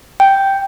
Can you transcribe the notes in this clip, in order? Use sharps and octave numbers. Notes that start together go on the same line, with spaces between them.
G5